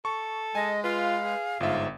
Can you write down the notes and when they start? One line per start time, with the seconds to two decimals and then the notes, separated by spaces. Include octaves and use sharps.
0.05 A4 C#6
0.55 G#3 D#5 G#5
0.84 F4 B4 F5
1.24 G#4
1.60 G1 G#2 F4 E5